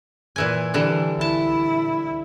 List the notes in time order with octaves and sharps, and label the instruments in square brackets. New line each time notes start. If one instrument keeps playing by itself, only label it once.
[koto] A#2 E3 G#5
D3 E3 G3
[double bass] E4 [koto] A5